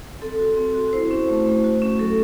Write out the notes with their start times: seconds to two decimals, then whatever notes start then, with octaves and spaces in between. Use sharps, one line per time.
0.22 C4 A4
0.40 F#4
0.57 C4
0.75 F#4
0.93 E4 C5
1.11 C#4
1.29 A3
1.46 A3
1.64 F#4
1.82 C#4
1.99 F#3 A4